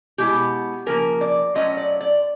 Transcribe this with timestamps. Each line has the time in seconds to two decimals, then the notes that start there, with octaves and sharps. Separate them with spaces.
0.18 B2 G#3 B3 E4 G4
0.86 C#3 F3 A#3 A#4
1.21 D5
1.55 F#3 A3 C#4 F4 D#5
1.77 D5
2.01 D5